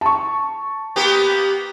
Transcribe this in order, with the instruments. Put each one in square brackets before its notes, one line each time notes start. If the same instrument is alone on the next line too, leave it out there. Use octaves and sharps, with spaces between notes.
[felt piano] A5 C#6
[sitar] A#3 B3 G4